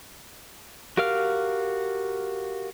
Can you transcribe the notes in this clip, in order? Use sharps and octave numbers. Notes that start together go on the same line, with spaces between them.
F#4 G4 A#4 F5 F6